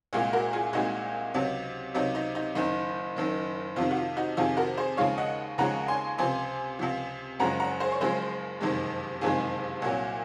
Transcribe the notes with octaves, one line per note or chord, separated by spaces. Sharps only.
C2 A#2 G#3 F4 G#4
F#4 A#4
F4 G#4
C2 A#2 G#3 D#4 F#4
C#2 C3 F#3
C#2 C3 F#3 D#4
D#4
D#4
F#1 F#2 D#3 D#4
F#1 F#2 D#3
F2 C3 D#3 F4
F#4
F4
D#4 F#4
F2 C3 D#3 F4 G#4
F#4 A#4
G#4 C5
D#2 C#3 F3 G#3 C#5 F5
D#5 F#5
D#2 C#3 F3 G#3 F#5 A#5
G#5 C6
C#2 C3 F3 G#5 C6
C#2 C3 F3
F#1 F#2 C#3 F3 G#3 F#5 A#5
F#5 A#5
G#4 C5
C#5
F#1 F#2 C#3 F3 G#3 G#4 C5
F#1 F2 C3 D#3 G#3
F#1 F2 C3 D#3 G#3 F4 G#4
C2 A#2 F#3